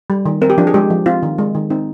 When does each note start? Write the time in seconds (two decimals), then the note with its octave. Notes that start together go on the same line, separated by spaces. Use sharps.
0.10 G3
0.25 D#3
0.41 C4 A#4
0.50 G4
0.58 F3 D4
0.67 G#4
0.74 G#3 G4
0.90 F3
1.06 C4 F4
1.23 D#3
1.38 G#3
1.55 D#3
1.70 C4 D#4